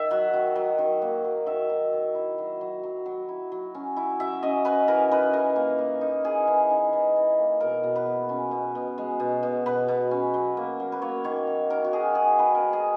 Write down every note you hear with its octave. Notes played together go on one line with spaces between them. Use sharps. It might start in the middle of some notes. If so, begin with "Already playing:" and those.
Already playing: D#3 E5
F#3 F#5
D#3
F#3
D#3
A#3
F#3
D#3 E5
F#3
D#3
E4
F#3
F#3
F#3
F#3
E4
F#3
C#4
E4
F#3 E5
C#4 D#5
C#4 B4
E3 A#4
D#4 B4
E3 A#4
A#3
A#3
D#4
E3 G#4
E3
D#4
E3
E3
A#3
B2 A#4
B2
B4
B2
C#4
B2
B2
G#3
B2
B2
B2 B4
B2
C#4
F#3
A#3
F#3
B4
A#3 C#5
D#3 C#5
F#3
D#3 A#4
F#4
F#3 G#4
F#3 G#4
D#3 B4
A#4
F#3
G#4